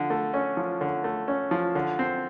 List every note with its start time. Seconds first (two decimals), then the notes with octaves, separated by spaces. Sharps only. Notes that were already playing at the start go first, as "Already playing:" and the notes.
Already playing: D3 F3
0.10 A3
0.34 C#4
0.57 F3
0.81 D3
1.04 A3
1.28 C#4
1.51 F3
1.75 D3
1.99 C4